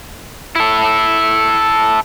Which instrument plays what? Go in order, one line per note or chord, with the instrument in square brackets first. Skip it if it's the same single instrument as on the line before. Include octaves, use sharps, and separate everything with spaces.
[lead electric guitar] E4 A4